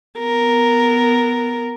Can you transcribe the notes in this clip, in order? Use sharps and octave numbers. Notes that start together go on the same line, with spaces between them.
B3 A#4